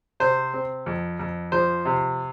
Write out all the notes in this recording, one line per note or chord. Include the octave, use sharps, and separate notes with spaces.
C3 C5
C4
F2
F2
F3 C5
C3